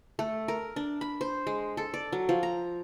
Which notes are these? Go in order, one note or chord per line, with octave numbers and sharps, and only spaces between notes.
A3
A#4
D4
B5
C5
G#3
A4
D5
F#3
F3
A#5